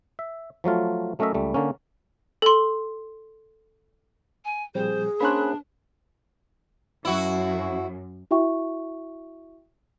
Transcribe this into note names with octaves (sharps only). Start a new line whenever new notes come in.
E5
F3 F#3 A3 F4
F#3 A3 C#4 A#4 D#5 E5
C#2 G3 A3
D3 A#3 C#4
A4 C6
G#5
A#2 F3 G3 C4 G#4 C5
A#3 C#4 D4 C5 B5 F#6
F#2 E4 F#4
E4 F#4 E5 G5 C#6